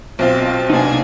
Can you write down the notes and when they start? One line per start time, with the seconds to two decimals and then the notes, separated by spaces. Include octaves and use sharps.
0.19 B1 C4 F4 A5
0.70 C3 A#3 D4 D#4 G#4